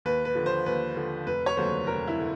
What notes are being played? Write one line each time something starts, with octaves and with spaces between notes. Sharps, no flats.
D#2 B4
B4
D3 F3
C5
D#2 B4
D3 F3
F1 B4
C#5
D#2 D3 F#3 C5
F1 A#4
E4
D3